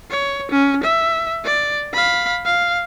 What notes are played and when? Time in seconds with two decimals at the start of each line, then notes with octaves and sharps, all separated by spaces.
0.11 C#5
0.51 C#4
0.83 E5
1.45 D5
1.94 F5 B5
2.45 F5